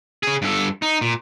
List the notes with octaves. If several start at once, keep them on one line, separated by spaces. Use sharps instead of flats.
C#3 G#4
G2 A4
D#4
A#2